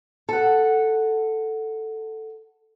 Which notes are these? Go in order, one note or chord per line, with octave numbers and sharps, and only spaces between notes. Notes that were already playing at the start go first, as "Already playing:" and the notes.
A4 F#5